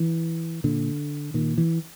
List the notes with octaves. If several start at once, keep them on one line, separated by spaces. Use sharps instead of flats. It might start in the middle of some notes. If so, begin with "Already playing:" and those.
Already playing: E3
A#2 D3
A#2 D#3
E3